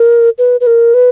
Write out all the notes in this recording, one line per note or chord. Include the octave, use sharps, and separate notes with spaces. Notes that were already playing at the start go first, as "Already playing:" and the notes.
Already playing: A#4
B4
B4
A#4
B4